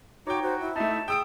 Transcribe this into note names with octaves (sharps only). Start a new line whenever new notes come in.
D#4 F#4 C#5 G5 D6
F#4 C5
E4
A3 D#4 E5 A5
G#4 G5 D#6 E6 D7